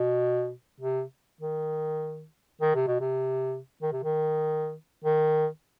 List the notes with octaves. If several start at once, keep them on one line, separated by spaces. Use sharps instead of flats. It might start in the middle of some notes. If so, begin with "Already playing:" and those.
Already playing: B2
C3
D#3
D#3
C3
B2
C3
D#3
C3
D#3
D#3